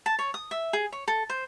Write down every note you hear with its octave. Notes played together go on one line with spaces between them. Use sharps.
A5
C#5
D#6
E5
G#4
C#5
A4
C5